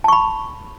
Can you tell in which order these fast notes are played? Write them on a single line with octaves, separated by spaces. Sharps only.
A5 C#6 B5